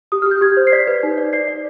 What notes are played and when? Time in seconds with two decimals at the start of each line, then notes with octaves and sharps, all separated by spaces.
0.12 G4 D#6
0.22 F6
0.26 G4
0.31 G6
0.41 G4 G#6
0.57 C5
0.67 C7
0.72 D5 B6
0.87 B4
1.03 D#4
1.18 D5
1.33 D5 C7
1.48 D5